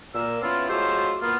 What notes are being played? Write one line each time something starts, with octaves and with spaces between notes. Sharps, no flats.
A#2 A#3 E6
B3 C#4 E4 F4
F#3 G#3 A3 F4 G4 C5
A#3 B3 F4